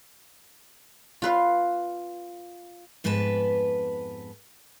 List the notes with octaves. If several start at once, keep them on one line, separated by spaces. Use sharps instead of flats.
F4 B4 F5
F2 G#2 B3 B4 A5